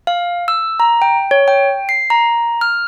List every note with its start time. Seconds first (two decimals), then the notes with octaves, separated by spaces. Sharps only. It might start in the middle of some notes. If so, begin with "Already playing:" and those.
0.07 F5
0.48 E6
0.80 A#5
1.02 G5
1.31 C#5
1.48 G5
1.89 C7
2.10 A#5
2.61 F6